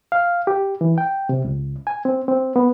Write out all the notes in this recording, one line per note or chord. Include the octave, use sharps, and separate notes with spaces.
F5
G4
E3
G5
C3
C#2
G#5
C4
C4
B3